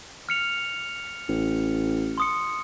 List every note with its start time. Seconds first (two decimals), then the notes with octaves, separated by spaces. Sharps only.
0.29 F6 C#7 F7
1.28 A1
2.18 C6 D#6 C#7